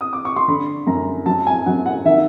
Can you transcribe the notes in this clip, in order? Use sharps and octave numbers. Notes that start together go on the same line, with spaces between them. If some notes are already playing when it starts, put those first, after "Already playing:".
D#6
D6
C#6
C6
D3 B5
F#2 A#5
F#3 A5
G#5
F#3 F#5
F#5
D#3 E5